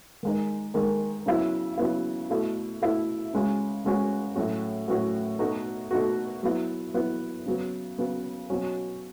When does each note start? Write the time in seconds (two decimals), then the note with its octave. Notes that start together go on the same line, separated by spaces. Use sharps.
0.23 D#3 G#3 D#4
0.74 D#3 G#3 D#4
1.26 C#3 F#3 B3 E4
1.78 C#3 F#3 B3 E4
2.30 B2 A3 E4
2.82 B2 A3 E4
3.33 C#3 G#3 C#4 F#4
3.84 C#3 G#3 C#4 F#4
4.36 A2 F#3 C#4 F#4
4.88 A2 F#3 C#4 F#4
5.39 B2 A3 D#4 F#4
5.91 B2 A3 D#4 F#4
6.43 F#3 B3 E4
6.94 F#3 B3 E4
7.46 C#3 F#3 B3
7.98 C#3 F#3 B3
8.50 B2 F#3 C#4 F#4